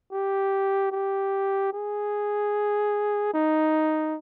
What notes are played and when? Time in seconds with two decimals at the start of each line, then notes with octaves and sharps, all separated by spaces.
0.12 G4
0.92 G4
1.73 G#4
3.34 D#4